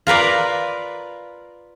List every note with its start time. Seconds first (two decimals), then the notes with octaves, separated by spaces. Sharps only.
0.07 F4 A#4 B4 D5